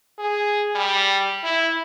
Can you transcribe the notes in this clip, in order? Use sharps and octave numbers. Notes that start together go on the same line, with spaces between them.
G#4
G3
E4